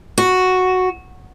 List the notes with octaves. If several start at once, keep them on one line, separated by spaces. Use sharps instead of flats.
F#4